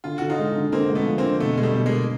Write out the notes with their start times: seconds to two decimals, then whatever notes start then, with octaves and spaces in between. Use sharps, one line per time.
0.04 D3 F4
0.18 D3 F#4
0.29 D#4 F4
0.39 G#3
0.56 D3
0.72 D3 A#3 C4
0.90 G#3
0.95 A3 B3
1.07 F3
1.18 A#3 C4
1.24 D3
1.40 B2 A3 B3
1.58 B2 G#3
1.63 G3 A3
1.75 B2
1.86 G#3 A#3
1.92 B2